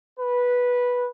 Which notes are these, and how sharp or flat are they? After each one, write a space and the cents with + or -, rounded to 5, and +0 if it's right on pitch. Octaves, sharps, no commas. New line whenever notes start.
B4 -10